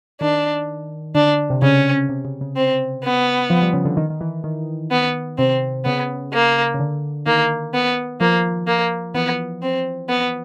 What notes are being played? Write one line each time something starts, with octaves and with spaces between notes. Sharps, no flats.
D#3 D4
D3 D4
C3
C#3 C#4
C3
C#3
C#3
C4
B3
F3
G3
C#3
D3
D#3
D#3
E3
D#3
B3
C3 C4
C#3 B3
A#3
C#3
D3
D#3 A#3
B3
F3 A#3
A#3
E3 B3
C4
B3